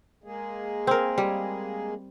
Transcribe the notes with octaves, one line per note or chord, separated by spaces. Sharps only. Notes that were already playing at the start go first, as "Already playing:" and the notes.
G#3 A#3 G#4
C4 A#4
G3